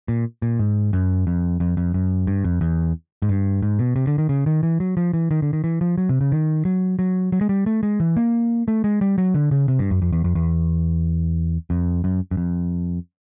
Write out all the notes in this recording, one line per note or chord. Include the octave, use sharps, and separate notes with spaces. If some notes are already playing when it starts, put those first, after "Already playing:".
A#2
A#2
G#2
F#2
F2
F2
F2
F#2
G2
F2
E2
G#2
G2
G#2
B2
C3
D3
D#3
C#3
D#3
E3
F#3
F3
E3
D#3
D3
D#3
E3
F3
F#3
C3
C#3
D#3
F#3
F#3
F#3
G#3
G3
A3
G#3
E3
A#3
A3
G#3
G3
F#3
D3
C#3
C3
G2
F#2
F2
E2
F2
E2
F2
F#2
F#2
F2